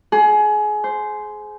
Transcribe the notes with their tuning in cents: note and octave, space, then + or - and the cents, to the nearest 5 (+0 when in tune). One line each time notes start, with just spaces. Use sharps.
G#4 +25
C5 -10